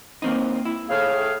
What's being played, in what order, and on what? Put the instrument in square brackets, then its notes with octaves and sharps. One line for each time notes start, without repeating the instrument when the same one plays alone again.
[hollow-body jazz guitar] A#3 C4 D#4
E4
[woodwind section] A2 G#4 F5